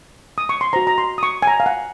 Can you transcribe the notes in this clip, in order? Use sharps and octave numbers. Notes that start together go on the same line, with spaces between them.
D#6
C#6
C6
F#4 C5 A#5
A#5
C6
D#6
C#6
G#5
A#5
F5
F#5